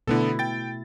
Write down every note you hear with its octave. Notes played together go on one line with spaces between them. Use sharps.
B2 D3 A3 B3 E4 A4
G5 A6